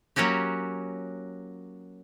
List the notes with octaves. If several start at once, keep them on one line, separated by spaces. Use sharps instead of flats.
F#3 A#3 C#4 F#4 G4